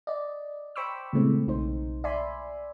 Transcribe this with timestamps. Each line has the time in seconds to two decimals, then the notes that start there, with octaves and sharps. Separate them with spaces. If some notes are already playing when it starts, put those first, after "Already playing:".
0.07 D5 D#5
0.76 C5 G5 B5 C#6 D6 E6
1.13 A#2 C#3 E3 G#3 A3 C4
1.47 B1 D#4 C5
2.04 D5 E5 G#5 B5 C6